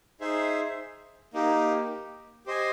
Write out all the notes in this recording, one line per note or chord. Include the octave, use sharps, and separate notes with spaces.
D#4 G#4 C5 E5
A#3 D#4 G4
G4 C5 D#5 G#5